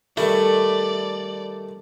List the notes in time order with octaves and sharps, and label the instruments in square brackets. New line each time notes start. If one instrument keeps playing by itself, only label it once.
[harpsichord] D#3 G3 E4 [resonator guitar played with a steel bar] A3 [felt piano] A4 [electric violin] D5